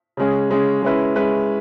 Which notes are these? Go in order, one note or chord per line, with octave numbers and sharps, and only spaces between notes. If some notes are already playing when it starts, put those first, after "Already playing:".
C#3 G#3 C#4 G#4
C#3 G#3 C#4 G#4
G#3 C#4 E4 B4
G#3 C#4 E4 B4